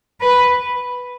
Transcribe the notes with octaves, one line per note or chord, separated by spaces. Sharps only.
B4